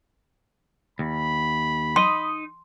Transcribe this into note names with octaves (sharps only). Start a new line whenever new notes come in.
D#2 B5
D#4 D#5 C6